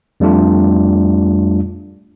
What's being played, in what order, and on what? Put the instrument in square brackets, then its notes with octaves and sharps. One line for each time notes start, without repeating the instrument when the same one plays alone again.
[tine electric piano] F2 G3 A3 D4 F4